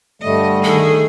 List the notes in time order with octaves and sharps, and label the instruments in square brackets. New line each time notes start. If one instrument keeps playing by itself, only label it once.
[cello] G2 D#5 [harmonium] D3 G3 A3
[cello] D#3 G#4 [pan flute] A4